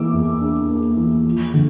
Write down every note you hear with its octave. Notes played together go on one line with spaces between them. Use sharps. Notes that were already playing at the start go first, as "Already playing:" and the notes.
Already playing: E3 A#3 D6 E6
E2
D4
A#3
E3
F3
D3